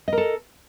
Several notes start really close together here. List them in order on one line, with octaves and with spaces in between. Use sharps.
D#5 A#4 A4